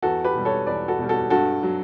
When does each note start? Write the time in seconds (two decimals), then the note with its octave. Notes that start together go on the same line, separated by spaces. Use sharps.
0.02 E2 F#4 A4
0.25 G4 B4
0.35 B2 G3
0.45 A4 C#5
0.66 E2 B4 D5
0.88 F#4 A4
0.99 B2 G3
1.09 F#4 A4
1.30 G2 F#4 A4
1.63 F#3